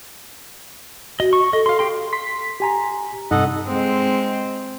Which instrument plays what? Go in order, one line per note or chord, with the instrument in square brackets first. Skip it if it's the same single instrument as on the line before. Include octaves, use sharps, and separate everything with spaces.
[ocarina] F#4 [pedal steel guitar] D#5
[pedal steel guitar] C#6
[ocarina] A4 [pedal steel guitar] D#5
[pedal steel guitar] F5 C6
G4 G5 C6
[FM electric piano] C6 B6
[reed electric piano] G4 G#5 A#5
[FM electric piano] G2 C3 [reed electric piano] D#4 [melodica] A4 D#5 F#5
[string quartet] G#3 C4